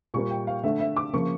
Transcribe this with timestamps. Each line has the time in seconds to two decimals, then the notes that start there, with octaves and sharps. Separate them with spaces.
0.14 A#2 G3 A#3 C#6
0.31 G5
0.47 F5
0.63 D3 A3 E5
0.80 E5
0.97 D6
1.13 C#3 F3 A#3 C#6